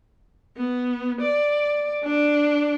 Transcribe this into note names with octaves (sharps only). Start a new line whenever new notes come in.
B3
D5
D4